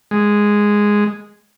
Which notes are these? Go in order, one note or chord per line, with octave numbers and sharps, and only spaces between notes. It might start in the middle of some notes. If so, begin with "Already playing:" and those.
G#3